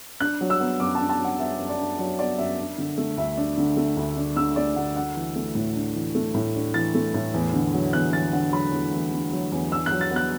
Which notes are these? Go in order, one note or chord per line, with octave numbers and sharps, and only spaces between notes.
D4 F#6
F#3
E6
B3
F#2 D6
D4 A5
A5
F#3
F#5
B3 E5
F#2
D5
D4
F#3 D5
B3 D5
F#2 E5
D4
D3
A3
D2 E5
D4
D3
A3
D2
D4
D3 E6
A3 D5
D2 F#5
D4 F#5
E3
A3
A2
D4
E3
A3
A2
D4
E3 A6
A3
A2
E2
D3
F#3
E2 F#6
E2 A6
D3 F#5
F#3 B5
E2
E2
D3
F#3
E2
D4 E6
F#6
F#3
A6
B3
F#6